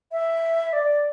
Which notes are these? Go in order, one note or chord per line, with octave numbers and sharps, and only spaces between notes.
E5
D5